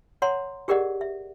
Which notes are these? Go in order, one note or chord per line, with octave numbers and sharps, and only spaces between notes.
C#5 F#5 A#5 C6
G4 G#4 A#4 D5 D#5 F#5
E5